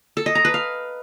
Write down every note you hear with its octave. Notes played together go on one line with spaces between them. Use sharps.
A4
D#5
A#5
B4
F5